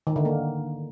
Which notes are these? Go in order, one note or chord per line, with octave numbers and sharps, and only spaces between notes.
D#3
D3
A#3